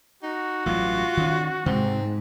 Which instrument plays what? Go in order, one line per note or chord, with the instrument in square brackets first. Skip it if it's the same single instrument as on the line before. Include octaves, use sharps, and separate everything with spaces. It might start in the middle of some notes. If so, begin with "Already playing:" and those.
[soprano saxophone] D#4 [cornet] F#4
[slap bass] A1 G2 F#3 [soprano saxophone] F4
[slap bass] D#3 C#4
[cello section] G#2 [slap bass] C3 [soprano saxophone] C4